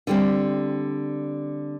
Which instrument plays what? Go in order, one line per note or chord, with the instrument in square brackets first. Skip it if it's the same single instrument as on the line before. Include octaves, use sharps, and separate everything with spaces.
[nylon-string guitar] D3 G3 C4